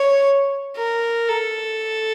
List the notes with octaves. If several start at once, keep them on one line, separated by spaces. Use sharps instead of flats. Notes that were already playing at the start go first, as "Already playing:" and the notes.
Already playing: C#5
A#4
A4